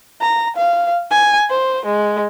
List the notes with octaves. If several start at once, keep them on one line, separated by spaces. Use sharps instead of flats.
A#5
F5
G#5
C5
G#3